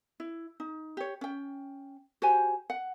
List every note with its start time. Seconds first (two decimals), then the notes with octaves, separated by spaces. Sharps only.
0.20 E4
0.60 D#4
0.97 G4 C#5
1.21 C#4 G5
2.22 F#4 G4 C5 G#5
2.70 F#5